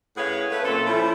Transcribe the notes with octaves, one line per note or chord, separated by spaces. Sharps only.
A2 C#4 G#4 B4 F5 F#5
A3 B4
F#2 A#2 A3 C4 A4
E3 F3 C#4 E4